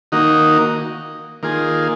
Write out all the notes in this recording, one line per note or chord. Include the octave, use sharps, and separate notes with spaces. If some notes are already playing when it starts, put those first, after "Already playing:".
D#3 A#3 D#4 F#4
D#3 A#3 F4 G#4